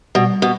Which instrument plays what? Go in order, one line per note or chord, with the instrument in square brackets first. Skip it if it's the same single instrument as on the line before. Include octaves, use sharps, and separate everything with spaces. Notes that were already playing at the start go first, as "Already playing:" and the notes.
[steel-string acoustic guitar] B2 [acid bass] G3
[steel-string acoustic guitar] B2